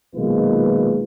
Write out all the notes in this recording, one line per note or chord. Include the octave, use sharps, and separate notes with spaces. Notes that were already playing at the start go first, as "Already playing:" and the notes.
B1 A#2 D#3 G#3 F4 B4